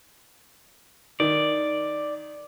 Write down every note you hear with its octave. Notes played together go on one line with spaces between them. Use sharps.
D#3 D5